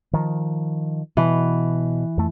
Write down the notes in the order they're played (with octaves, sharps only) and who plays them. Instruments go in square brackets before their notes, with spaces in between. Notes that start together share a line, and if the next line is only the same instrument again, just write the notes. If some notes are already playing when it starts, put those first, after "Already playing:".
[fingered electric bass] D#3 F3
[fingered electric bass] B2 [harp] E3
[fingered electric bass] F2 A3